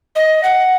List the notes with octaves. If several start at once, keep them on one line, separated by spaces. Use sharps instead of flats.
D#5
F#5